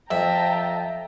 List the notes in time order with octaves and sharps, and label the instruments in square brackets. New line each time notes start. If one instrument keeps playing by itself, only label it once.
[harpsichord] F2 [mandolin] E5 [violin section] G5 A5 A#5